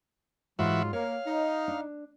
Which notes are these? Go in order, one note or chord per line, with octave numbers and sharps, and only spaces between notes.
G#2 E3 F#3 F4 F#4 E5
A#3 C#5 F5
D#4
D4